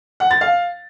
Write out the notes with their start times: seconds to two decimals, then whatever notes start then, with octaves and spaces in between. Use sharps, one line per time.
0.20 F#5
0.31 A6
0.41 F5